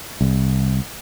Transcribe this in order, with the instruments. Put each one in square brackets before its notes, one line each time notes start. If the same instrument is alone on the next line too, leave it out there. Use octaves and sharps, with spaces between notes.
[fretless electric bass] C2